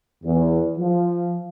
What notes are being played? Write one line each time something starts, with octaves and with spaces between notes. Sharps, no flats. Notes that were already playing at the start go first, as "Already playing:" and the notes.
E2
F3